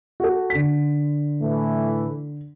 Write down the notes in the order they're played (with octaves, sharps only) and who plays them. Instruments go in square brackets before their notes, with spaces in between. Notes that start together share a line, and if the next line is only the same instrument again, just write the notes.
[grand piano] F#4 A4
D3 B6
[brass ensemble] A2 E3 A3